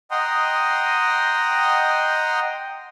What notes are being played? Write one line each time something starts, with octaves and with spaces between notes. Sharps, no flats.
D#5 F#5 G5 A#5 C6 D#6